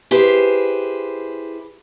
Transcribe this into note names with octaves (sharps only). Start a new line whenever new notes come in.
E4 G4 G#4 B4 C5